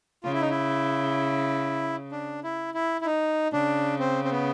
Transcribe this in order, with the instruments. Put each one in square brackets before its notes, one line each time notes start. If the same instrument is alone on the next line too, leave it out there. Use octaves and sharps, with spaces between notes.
[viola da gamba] C#3 [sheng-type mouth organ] F4
[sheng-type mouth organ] E4
D#4
E4
D4
E4
E4
E4
D#4
[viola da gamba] C#3 [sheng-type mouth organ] D4
[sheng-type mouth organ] C4
C4
B3